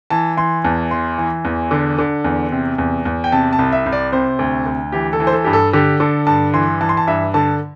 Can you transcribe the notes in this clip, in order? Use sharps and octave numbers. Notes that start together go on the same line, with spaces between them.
E3 A5
E3 C6
E2 A5
E3 C6
E3
E2
D3
D3
E2
C3
E2
E2
G5
C3 A5
A5
C2
E5
C2
D5
C3 C5
D2
D2
E3 G4
A4
E3
C5
A4
G2 G4
A4
D3 G4
D3 A4
G2 A5
E3 C6
E3 A5
C6
A5
G2 E5
D3 A5